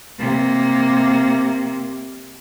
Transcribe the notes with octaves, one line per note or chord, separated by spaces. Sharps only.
C3 A#3